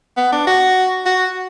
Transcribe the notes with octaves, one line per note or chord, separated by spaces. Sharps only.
B3
D4
F#4
F#4